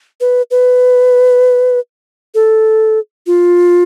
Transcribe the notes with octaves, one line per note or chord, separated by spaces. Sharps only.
B4
B4
A4
F4